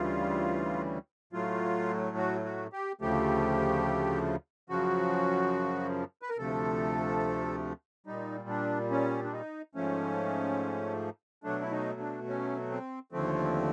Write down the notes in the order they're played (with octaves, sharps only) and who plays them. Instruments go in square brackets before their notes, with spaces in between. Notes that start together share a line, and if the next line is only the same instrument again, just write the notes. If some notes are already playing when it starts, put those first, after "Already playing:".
Already playing: [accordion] D2 C#3 E3 G3 F4
A2 F#3 A3 F4
F#4
F#4
G4
D2 C#3 F3 A3 G4
F#2 C#3 F3 F#4
B4
A#4
D2 C3 F3 A3 A4
A#2 G3 D#4
D4
C#4
D4
D#4
G#2 F3 A3 C#4
B2 F#3 A3 D4
E4
D#4
D4
C#4
C4
D#2 D3 F3 A3 C4